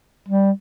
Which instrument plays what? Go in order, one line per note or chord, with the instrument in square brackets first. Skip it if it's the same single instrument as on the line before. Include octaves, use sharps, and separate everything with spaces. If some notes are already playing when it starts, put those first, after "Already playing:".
[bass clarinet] G3